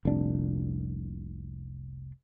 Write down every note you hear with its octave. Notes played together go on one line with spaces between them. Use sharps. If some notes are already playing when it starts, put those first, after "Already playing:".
F1 C2 A#2 D4